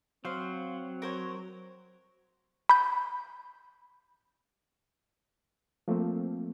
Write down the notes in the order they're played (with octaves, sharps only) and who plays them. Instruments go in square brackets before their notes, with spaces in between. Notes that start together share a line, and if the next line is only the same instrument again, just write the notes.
[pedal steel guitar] F#3 [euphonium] C4 [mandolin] C5 F5
[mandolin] A#4 C5 C#5
[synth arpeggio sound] B5 G6
[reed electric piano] F3 A3 A#3 C4